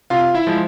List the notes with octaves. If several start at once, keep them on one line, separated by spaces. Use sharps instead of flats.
C3 F4 F5
E4 E5
F3 G#3